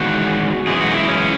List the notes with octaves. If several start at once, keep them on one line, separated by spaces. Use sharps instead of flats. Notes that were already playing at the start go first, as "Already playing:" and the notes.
Already playing: E2 D#3 G#3 F#4
F#2 E3 G#3 G#4
F#4
D#4
E4
C#4